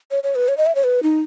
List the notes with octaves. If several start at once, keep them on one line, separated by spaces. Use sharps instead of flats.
C#5
C#5
B4
C#5
D#5
E5
C#5
B4
D#4